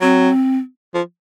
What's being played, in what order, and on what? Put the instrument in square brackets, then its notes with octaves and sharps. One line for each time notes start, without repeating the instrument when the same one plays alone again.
[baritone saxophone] F#3 [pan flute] C4
[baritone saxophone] F3